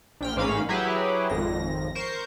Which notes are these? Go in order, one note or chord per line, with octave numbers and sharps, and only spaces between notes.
A#1 G5 F6
A1 G#2 A#3 C#4 F5 B5
F#3 E4 G4 G#4 B4
G#1 F2 A#6
A#4 C5 C#6 G6